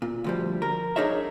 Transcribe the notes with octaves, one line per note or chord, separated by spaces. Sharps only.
A#2
D2 F3 G3
A#4
D4 D#4 G#4 A#4 C#5 E5